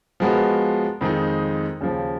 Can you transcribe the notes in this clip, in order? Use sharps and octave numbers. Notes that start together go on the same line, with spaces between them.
F3 G#3 B3 F#4 A#4
F2 D#3 G#3 D#4
D#2 C#3 F3